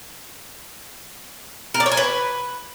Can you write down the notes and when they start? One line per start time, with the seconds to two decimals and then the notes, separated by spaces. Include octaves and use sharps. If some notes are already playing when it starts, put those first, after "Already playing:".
1.74 A#4
1.80 D5
1.86 C#5
1.92 G#5
1.97 B4